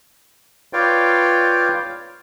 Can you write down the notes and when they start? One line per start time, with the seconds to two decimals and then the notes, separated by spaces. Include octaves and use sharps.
0.73 F4 B4 C#5 D5 F5 G5